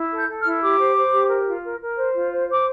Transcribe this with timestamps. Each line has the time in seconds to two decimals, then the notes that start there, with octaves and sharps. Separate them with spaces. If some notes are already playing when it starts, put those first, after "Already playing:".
Already playing: E4
0.12 A4
0.17 G6
0.28 A4
0.40 F6
0.45 E4
0.62 G4 D6
0.79 C5
0.96 C5
1.12 G4
1.29 A#4
1.46 F4
1.63 A#4
1.80 A#4
1.96 C5
2.14 F4
2.31 C5
2.47 C5
2.53 D6